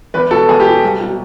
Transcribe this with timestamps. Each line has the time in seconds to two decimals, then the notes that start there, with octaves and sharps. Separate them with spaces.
0.14 E2 B4
0.31 B2 F#3 A4
0.48 E2 G#4
0.60 G4
0.66 B2 F#3
0.83 C2
1.00 B2 F#3